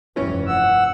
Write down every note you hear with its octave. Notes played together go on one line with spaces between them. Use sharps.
F1 G2 E3 C#4
F#5 E6